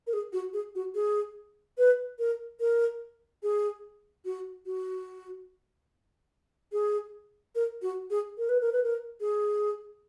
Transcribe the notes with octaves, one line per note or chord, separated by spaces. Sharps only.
A#4
G#4
F#4
G#4
F#4
G#4
B4
A#4
A#4
G#4
F#4
F#4
G#4
A#4
F#4
G#4
A#4
B4
A#4
B4
A#4
G#4